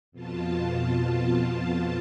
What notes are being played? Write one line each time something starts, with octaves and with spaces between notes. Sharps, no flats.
F2 B2 F4 A5